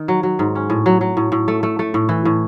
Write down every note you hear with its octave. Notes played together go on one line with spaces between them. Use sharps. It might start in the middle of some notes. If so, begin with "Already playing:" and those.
Already playing: D#3
F#3
F#3
G#2
C#4
A2
F#3
F#3
A2
A2
A3
A3
A3
A2
E3
A2